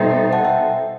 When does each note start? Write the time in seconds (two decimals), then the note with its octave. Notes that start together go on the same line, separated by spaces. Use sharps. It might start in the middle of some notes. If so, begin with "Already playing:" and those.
Already playing: B2 G3 D#4 A4 C5 E5 G5
0.33 F#5 A5
0.45 E5 G5